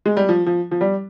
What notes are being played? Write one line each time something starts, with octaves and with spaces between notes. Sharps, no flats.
G#3
G3
F3
F3
F3
G3